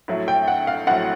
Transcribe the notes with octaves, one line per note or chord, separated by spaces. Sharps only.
A#1 A2 F#3
G5
F#5
F5
A#1 A2 F#3 F#5